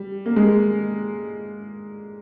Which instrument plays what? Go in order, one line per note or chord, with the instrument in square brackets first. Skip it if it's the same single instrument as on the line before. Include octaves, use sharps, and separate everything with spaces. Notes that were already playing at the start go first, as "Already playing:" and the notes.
Already playing: [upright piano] G3
A#3
G#3